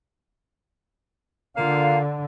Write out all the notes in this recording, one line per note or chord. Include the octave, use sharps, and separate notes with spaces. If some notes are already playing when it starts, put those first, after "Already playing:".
D3 A#3 F4 F5